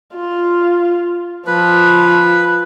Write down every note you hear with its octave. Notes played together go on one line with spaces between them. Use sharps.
F4
F3 B4